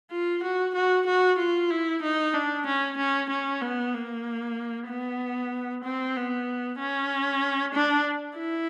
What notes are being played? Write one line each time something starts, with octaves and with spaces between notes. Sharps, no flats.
F4
F#4
F#4
F#4
F4
E4
D#4
D4
C#4
C#4
C#4
B3
A#3
B3
C4
B3
C#4
D4
E4